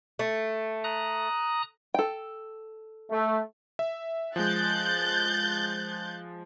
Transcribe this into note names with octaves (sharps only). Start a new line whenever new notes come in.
A3
A#5 D#6 F#6
A4 G5
A3
E5
F3 G#3 F#6 G6 A6